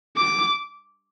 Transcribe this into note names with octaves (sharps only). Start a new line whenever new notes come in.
D6